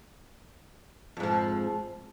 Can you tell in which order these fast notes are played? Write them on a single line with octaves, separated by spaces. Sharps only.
F2 G#2 F3